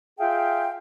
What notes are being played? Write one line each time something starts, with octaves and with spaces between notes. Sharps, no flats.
F4 G#4 E5 F5 G5